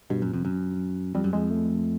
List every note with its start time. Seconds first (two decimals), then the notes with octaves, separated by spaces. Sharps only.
0.10 G2 B2
0.22 F#2 A#2
0.33 F2 C3
0.45 F#2
1.15 F2 G3
1.24 F#2
1.33 F2 G#3
1.50 A3